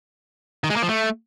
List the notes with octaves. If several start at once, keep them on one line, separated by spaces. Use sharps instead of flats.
D#3
G#3
A#3
F3
A3